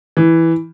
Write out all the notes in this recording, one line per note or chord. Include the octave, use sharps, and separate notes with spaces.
E3